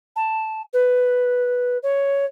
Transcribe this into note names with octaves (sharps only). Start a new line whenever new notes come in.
A5
B4
C#5